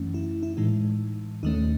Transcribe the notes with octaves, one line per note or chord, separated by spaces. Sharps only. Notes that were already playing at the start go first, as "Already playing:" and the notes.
Already playing: F#2 E3 A3 C#4
E4
E4
A2 E3 G#3 D#4
D#2 D#3 A3 C#4 D#4